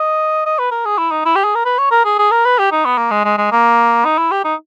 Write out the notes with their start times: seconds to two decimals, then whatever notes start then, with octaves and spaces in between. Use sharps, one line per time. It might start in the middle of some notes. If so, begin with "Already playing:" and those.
Already playing: D#5
0.46 D#5
0.59 B4
0.71 A#4
0.85 G#4
0.98 E4
1.11 D#4
1.25 E4
1.36 G4
1.45 G#4
1.55 A#4
1.65 B4
1.78 C#5
1.91 A#4
2.05 G#4
2.19 G#4
2.32 A#4
2.45 B4
2.59 G4
2.72 D#4
2.85 B3
2.98 A#3
3.11 G#3
3.24 G#3
3.38 G#3
3.52 A#3
4.05 D#4
4.18 E4
4.31 G4
4.44 D#4